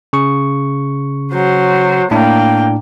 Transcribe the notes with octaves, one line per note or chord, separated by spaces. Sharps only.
C#3 C#6
F#3 C5
A2 A#3 D4 G5